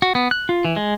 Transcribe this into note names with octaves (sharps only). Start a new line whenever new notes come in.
F#4
B3
F#6
F4
E3
G#3